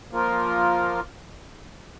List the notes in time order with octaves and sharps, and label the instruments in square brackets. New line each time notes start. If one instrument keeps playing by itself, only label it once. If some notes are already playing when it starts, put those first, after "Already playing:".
[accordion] F3 A#3 F4 A#4